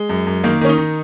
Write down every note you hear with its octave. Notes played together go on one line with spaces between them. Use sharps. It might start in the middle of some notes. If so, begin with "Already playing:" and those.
Already playing: G#3
F#2
F#2
D#3 A#3
D#3 C#4
D#4
D#3